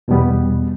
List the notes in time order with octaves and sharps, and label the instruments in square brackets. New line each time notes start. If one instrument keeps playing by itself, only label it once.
[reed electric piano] E2 B2 G3 B3